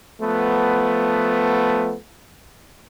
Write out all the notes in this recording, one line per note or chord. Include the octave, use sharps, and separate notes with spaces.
F3 A3 B3